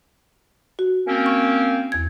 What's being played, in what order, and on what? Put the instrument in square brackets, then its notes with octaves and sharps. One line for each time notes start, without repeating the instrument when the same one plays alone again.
[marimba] F#4
[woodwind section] A#3 C4 C#4
[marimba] C#6
E2 G#6